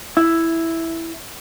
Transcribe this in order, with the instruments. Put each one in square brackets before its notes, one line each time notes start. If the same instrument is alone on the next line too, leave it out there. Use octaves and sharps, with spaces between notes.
[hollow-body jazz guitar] E4